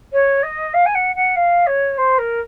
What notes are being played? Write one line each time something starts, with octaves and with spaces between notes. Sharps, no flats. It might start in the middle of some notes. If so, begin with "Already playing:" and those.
C#5
D#5
F5
G#5
F#5
F#5
F5
C#5
C5
A#4